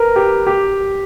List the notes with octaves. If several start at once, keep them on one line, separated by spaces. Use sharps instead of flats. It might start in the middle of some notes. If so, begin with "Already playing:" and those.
Already playing: A#4 B4
G4
G4